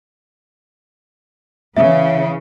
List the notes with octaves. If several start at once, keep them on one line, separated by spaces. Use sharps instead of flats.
C#3 E3 E5